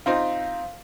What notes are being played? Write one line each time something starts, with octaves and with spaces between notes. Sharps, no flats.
C4 D#4 F4 F5